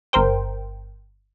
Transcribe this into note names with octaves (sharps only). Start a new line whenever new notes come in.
G1 A#4 C5 G5